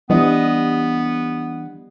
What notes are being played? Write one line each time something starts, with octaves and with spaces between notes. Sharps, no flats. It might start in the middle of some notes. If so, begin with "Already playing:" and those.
E3 G3 B3 D4 D#5